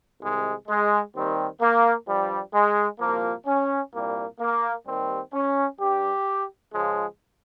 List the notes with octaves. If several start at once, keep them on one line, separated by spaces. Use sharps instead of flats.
C2 C3 D#3 G#3
G#3
D#2 D#3 G3 C4
A#3
G2 F3 G3
G#3
C2 A#2 F3 A#3
C#4
C2 A#2 G3 A#3
A#3
D#2 D#3 G3 C4
C#4
G2 G3 G4
C#2 C#3 F3 G#3